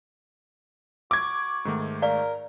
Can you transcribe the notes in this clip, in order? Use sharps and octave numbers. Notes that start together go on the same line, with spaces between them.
F#4 D6 G#6
G#2 D#3 A3
A#4 D5 F5